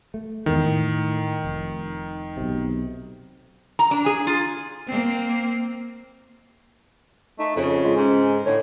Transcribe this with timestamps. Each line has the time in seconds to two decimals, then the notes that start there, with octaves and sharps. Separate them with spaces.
0.14 A3
0.46 E2 G#2 D#3 E3
0.64 A2
1.45 F1
2.37 B1 C3
3.79 A#5
3.91 D4
4.06 G#4
4.27 F4
4.87 A#3 C4
7.39 A3 D#4
7.56 F2 C#3
7.84 G#3 F4
7.96 G#2 C#4
8.46 A2 D3 C#5